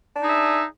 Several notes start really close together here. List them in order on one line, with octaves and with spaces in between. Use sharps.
D4 D#4 G#4 E5